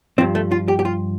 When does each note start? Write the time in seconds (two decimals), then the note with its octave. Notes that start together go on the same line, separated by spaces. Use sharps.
0.18 G2 F3 C4
0.35 A3
0.52 F4
0.68 G4
0.79 G4
0.85 F4